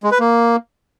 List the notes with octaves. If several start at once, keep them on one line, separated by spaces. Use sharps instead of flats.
G#3
B4
A#3